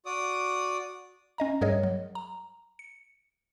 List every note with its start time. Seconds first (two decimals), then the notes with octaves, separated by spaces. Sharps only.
0.06 F#4 D5 D6 D#6
1.38 C#4 D#5 A#5
1.61 G2 G3 G#4 A#4 C#5 D#5
1.83 F#3
2.15 A#5
2.79 C#7